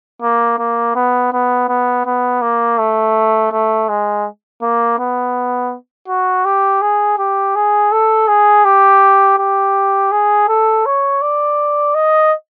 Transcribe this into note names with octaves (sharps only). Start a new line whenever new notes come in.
A#3
A#3
B3
B3
B3
B3
A#3
A3
A3
G#3
A#3
B3
F#4
G4
G#4
G4
G#4
A4
G#4
G4
G4
G#4
A4
C#5
D5
D#5